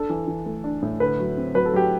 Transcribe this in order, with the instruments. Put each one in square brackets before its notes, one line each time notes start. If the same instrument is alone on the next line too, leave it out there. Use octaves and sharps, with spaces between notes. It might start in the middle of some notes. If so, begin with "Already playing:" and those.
Already playing: [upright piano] D4 [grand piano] A4
[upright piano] E3
E3
A3
D4
A2
[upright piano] D3 [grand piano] B4
[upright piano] F#3
C4
[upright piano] F#3 [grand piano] B4
[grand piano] A4
[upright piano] F#3 [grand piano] G4